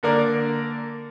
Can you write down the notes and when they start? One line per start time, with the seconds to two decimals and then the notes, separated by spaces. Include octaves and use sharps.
0.03 D3 A#3 A#4 D5